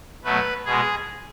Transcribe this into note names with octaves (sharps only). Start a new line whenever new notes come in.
B2 F#3 A3 B4
B2 G#3 G#4